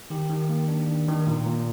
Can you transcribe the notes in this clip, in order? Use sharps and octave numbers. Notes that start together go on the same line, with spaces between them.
D#3 G4
D#3
A#3
D4
D#3
D#3
A#2
A#2